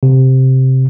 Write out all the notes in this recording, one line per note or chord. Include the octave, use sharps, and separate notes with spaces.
C3